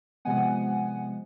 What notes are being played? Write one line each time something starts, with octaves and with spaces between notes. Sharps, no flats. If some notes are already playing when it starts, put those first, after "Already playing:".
C3 F3 G#3 B3 F#5 G#5